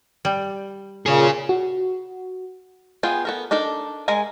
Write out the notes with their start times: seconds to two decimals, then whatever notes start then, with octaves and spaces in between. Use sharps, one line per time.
0.25 G3
1.06 A#2 C#3 G#4 C#5
1.49 F#4
3.03 B3 F4 G#4 G5 G#5
3.25 B3 A4 A#4
3.51 D4 D#4 A4 A#4
4.08 G#3 A#4 G#5 A#5